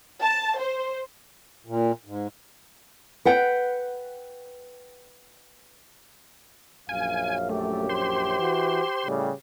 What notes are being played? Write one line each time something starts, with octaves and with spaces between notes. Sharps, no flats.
A5
C5
A#2
G#2
B4 F#5 G5
A#1 F#2 F5 G#5
A3 G4
C5 C6
E3 F#4
A2 C#3 G3